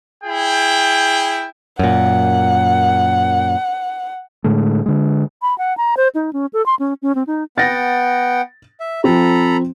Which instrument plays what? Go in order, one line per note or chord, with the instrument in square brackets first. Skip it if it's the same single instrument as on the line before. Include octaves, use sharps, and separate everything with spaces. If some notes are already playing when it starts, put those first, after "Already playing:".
[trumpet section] E4 G#4 G5
[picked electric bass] F#2 A#2 [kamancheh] F#5
[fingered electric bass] A2 D3 G#3 A3
D3 G#3
[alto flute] B5
F#5
A#5
C5
D#4
C#4
A4
C6
C#4
C#4
C4
D#4
[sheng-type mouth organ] B3 F#5 G5 [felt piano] A6 A#6
[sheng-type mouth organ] E5
[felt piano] F3 C4 [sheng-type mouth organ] A4 A#5 B5